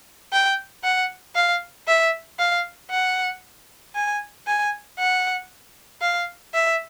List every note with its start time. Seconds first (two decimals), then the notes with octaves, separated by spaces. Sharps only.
0.33 G5
0.84 F#5
1.35 F5
1.88 E5
2.39 F5
2.91 F#5
3.95 G#5
4.47 G#5
4.99 F#5
6.02 F5
6.54 E5